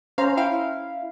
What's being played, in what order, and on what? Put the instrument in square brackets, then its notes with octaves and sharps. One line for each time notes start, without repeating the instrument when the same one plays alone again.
[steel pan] C#4 C5 A#5 [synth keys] F5
[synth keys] E4 F5 [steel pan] G5